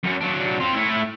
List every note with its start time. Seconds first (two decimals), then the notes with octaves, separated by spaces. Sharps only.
0.04 F#2 C#4
0.21 F#3 D4
0.60 C4 F4
0.74 A3 E4